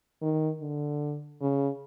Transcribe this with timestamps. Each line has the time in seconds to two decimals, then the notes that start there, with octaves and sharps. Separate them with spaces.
0.22 D#3
0.61 D3
1.41 C#3